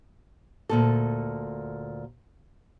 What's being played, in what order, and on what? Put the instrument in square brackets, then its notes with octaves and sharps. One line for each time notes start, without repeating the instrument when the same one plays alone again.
[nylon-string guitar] D2 A#2 A4